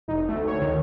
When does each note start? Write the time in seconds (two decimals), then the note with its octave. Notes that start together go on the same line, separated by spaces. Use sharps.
0.08 F1 D#4
0.28 D2 A3
0.48 C#5
0.62 D#3